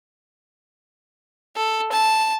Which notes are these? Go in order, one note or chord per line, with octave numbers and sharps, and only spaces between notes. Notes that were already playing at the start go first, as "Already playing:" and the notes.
A4
A5